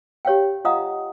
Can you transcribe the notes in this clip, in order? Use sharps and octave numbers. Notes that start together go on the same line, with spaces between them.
G4 C#5 F5 G5
F4 D#5 F5 F#5 A#5 D#6